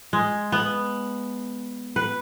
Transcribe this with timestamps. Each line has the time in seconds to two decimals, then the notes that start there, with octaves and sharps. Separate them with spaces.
0.13 G#3
0.52 B3
1.96 B4